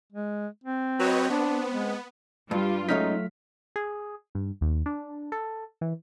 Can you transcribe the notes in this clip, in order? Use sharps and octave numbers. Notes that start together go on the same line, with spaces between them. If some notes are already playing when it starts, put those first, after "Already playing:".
G#3
C4
F#3 B4 C#5 D#5
B3 C4 D4
G#3
G2 G3 F4
G#2 F#3 A3 C#4 D#4 F6 B6
G#4
G2
D#2
D4
A4
E3